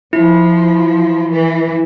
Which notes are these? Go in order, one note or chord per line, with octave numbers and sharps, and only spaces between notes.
F3 E4
E3